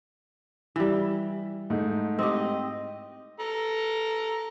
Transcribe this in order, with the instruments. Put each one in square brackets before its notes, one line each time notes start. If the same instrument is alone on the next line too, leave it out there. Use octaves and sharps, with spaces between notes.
[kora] E3 G3
[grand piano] G#2 A3 D#4
[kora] C4 G4 [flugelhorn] D#5
[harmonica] A4 A#5